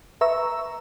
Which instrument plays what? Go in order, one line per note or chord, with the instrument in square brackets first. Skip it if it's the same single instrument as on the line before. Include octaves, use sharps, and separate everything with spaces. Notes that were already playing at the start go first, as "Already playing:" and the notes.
[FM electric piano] B4 E5 A#5 C#6 E6